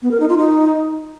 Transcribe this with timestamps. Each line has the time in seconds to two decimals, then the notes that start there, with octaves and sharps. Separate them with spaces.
0.02 B3
0.11 A#4
0.20 D#4
0.29 F4
0.38 D#4